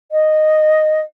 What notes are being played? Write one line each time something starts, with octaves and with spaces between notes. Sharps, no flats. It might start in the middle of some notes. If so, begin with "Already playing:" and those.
D#5